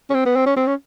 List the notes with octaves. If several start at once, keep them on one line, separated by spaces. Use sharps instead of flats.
C#4
C4
B3
C4
C#4
C4
C#4